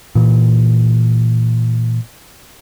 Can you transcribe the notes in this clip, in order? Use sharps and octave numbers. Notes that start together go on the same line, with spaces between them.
A#2 E3